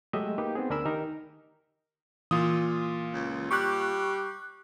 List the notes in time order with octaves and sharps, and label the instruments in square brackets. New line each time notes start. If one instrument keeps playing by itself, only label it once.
[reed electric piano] F#3 G#3 A3 G4 D#5 E5
A#3 D#4 G4 B4
B3 C4 G#4
D2 D4 A#4 G#5 B5 E6
D#3 D#4 G4 A#4
[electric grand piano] A#2 F4 D#6 [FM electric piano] E3
[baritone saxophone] C#2
[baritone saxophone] G3 [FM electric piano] C#6 D6 F#6